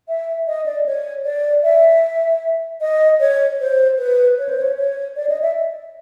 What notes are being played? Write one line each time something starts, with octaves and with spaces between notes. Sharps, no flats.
E5
D#5
D5
C#5
D5
E5
D#5
C#5
C5
B4
C#5
C5
C#5
C#5
D5
D#5
E5